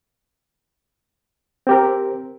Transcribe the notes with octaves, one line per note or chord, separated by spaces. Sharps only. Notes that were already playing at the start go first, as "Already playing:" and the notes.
C4 G4 A#4